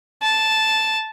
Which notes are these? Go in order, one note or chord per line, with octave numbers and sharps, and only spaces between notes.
A5